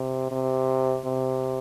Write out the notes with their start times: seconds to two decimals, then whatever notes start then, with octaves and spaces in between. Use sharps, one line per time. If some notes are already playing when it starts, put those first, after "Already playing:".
Already playing: C3
0.31 C3
1.05 C3